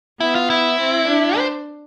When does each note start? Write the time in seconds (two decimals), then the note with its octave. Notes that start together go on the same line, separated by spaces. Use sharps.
0.20 B3 E4
0.35 F4
0.50 E4
0.79 C4
1.08 D4
1.38 C5